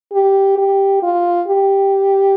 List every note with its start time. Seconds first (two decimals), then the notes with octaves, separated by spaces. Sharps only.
0.13 G4
0.58 G4
1.03 F4
1.48 G4